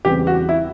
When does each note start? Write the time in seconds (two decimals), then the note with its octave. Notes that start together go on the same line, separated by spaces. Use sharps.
0.05 E2 C#3 E3 G3 C4 G4
0.27 F#4
0.49 E4